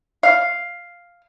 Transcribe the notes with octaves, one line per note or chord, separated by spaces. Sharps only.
F5